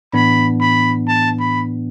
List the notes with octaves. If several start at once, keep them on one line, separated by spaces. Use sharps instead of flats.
A2 E3 B3 D4 B5
B5
A5
B5